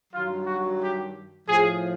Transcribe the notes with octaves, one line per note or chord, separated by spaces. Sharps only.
G2 D#3 F#3 F4
F#4
G4
A2 F3 G#4